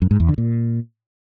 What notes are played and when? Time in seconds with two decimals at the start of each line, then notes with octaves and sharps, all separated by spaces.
0.02 F#2
0.11 G#2
0.20 E2
0.29 D3
0.38 A#2